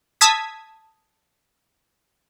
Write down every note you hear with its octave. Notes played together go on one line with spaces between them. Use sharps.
A5 D#6 E6 G#6 B6